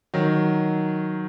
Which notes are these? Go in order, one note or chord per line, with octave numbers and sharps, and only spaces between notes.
D#3 F#3